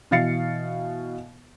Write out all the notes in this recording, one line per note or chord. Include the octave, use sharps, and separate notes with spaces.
B2 E3 F5 A6 C7 C#7